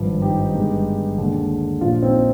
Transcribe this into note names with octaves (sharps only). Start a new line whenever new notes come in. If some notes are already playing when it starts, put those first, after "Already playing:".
Already playing: G#1 G2 F3
D#4 G4
G1 G2 D#3 G#3
D#2 D3 G#3
A#1 A#2 F3 D4 F4
C4 D#4